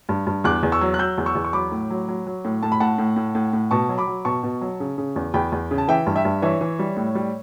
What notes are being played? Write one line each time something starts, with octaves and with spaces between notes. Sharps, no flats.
G2
G2
E2 D6 F#6
E2
C#6 E6
F#3
F#6
F#3 E6 G6
E2
C#6 E6
E2
C#6
F#3 B5 D6
A2
F#3
F#3
F#3
A2
A2 A5
B5
A2 F#5 A5
A2
A2
A2
A2
B2 A5 C#6
F#3
B5 D6
F#3
B2 A5 C#6
B2
F#3
C#3
C#3
E2
E2 G5 B5
E2
C#3
A5
E3 E5 G5
G2
E5 G5
G2
E3 C#5 E5
E3
G3
A2
G3